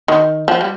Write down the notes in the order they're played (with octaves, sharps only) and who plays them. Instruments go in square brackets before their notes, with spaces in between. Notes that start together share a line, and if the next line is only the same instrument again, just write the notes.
[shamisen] D#3
F3
G3